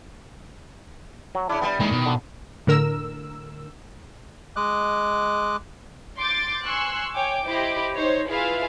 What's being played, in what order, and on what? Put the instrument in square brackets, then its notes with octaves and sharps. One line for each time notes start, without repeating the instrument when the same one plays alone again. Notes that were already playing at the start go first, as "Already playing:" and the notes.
[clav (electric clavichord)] F#3
[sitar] C#3 E4 [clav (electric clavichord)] D4
[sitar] G3 B3
[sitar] D#3 E3 [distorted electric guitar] G#3 A#3
[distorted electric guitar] B2
[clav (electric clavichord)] D3
[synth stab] A2 D3 A#4 E6
[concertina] G#3 D#5 D6 F#6
[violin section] C6 D6 G6 A6
G#5 C6 C#6 E6 F#6
C#5 G5 G#5 D6
E4 G4 C5 D#5 B5 D6
D#4 C5 C#5
E4 F4 G#4 B4 E5 F5